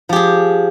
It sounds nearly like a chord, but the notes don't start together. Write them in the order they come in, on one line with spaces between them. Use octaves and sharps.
F3 G4 G#4